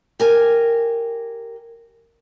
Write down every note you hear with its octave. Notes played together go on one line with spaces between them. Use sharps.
G4 A#4 G#5